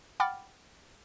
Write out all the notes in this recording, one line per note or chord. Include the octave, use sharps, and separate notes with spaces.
F#5 G5 B5 D6 F6 A6